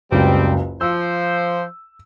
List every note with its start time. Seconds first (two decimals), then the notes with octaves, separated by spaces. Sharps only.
0.12 F#1 C#2 G3 C4
0.81 F3 C5 E6